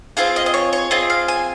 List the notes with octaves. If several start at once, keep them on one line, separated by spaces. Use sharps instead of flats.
C4 F4 G#4 F5
D#5
D#5
C#5
C#5
C4 F4 G#4 D#5
F5
G#5